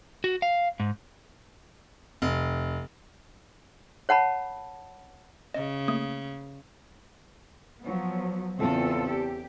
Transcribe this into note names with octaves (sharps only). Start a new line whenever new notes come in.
F#4
F5
G#2
F1
C#5 F#5 A5 B5
C#3 D#5
A3 A#3 D#6
F3 F#3 B3
E2 C#3 C4 F4 A4
G4